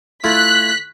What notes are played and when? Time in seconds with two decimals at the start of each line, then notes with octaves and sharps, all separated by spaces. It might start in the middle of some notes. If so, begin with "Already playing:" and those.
0.24 A3 E4 F4 F#6 B6